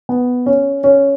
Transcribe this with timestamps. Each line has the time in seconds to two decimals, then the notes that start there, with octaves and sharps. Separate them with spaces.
0.09 B3
0.46 C#4
0.84 C#4